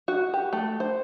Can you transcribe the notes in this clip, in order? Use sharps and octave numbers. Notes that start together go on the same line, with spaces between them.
F#4
G4
A3
C5